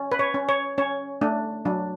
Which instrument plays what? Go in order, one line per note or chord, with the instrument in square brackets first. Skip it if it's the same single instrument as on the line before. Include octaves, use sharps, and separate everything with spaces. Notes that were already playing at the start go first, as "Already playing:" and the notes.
Already playing: [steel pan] C#4
B4
C#5
C#4
C#5
C#4 C#5
A3 D4
F#3 D4